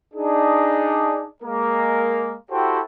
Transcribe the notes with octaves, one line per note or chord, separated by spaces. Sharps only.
D4 D#4 G#4
G#3 A#3 A#4
E4 F#4 G4 A4 C5 G5